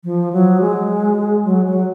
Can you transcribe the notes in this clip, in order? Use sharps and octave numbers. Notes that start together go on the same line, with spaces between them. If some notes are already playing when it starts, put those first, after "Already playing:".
F3
F#3
G#3
F#3
F#3